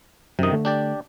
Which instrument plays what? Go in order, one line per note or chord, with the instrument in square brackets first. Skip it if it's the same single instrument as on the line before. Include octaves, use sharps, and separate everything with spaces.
[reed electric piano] F#2 D#6 [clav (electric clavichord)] C3 D#3
[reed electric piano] D3 A3
[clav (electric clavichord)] D4 G4 D5